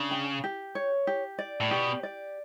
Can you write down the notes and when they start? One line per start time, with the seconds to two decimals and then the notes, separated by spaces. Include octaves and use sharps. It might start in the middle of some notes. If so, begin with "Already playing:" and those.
Already playing: C#3 D4
0.11 G5
0.44 G4
0.75 C#5
1.07 G4
1.39 D5
1.60 A2
1.70 B2 G4
2.03 D5